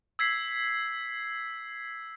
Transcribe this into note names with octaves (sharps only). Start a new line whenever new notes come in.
E6 G#6 B6 C7